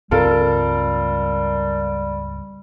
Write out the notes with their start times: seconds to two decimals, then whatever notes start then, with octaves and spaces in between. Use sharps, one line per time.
0.11 C#2 G2 G3 C4 F4 A4 A#4